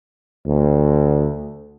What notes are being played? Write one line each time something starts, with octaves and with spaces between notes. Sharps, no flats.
D2